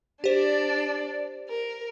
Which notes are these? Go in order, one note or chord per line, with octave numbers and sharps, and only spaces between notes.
D4 G4 C5 D5
A#4